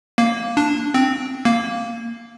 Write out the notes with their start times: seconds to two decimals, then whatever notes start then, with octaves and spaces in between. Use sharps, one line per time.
0.18 A#3
0.57 D4
0.94 C4
1.45 A#3